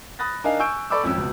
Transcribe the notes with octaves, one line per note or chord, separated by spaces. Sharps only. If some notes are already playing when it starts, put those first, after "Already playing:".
B5 D#6 F#6 A6 A#6
D4 D#4 A#4 D#5 F5 G#5
G#5 C#6 E6 G6 D7
A4 D5 B5 C#6 D6 E6
G#1 F2 C#4 E6
C#2 B2